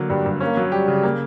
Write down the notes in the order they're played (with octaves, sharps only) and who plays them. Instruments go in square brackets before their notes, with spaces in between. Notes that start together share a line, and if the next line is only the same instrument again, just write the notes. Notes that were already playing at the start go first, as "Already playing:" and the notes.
Already playing: [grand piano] D3 F#3 A#3
[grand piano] G2 [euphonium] G3
[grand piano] G2
[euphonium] A#3 [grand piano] C#4
[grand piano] F#3
[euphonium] G3 [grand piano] G4
[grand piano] C#3
A#3